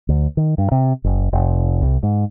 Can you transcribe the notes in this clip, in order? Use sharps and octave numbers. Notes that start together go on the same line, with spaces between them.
D2
D#3
G2
C3
F#1
F1
C2
G#2